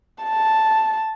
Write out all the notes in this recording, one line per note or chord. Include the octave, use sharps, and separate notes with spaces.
A5